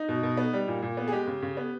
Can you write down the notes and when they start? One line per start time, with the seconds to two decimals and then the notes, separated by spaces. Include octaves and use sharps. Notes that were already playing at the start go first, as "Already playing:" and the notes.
Already playing: D#4
0.09 B2
0.23 B2
0.37 B3
0.53 G3
0.68 A#2
0.82 A#2
0.97 B3
1.08 G#4
1.12 G#3 G4
1.27 C#3
1.42 C#3
1.57 B3